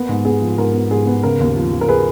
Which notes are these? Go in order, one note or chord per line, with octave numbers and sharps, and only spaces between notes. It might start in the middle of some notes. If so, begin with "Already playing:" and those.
Already playing: A#3 B3
G#2
B3 G#4
F3
G#2 A#4
B3
G#2 G#4
B3
C#3 A#4
D#2
F3
F3
A#4
G#4 B4